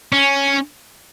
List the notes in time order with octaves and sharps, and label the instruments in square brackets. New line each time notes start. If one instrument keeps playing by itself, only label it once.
[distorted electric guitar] C#4